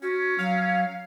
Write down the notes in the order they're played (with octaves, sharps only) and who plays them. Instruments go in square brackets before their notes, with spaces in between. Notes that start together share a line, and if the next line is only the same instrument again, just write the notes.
[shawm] C#4 [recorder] F#4
[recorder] F#3 [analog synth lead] F5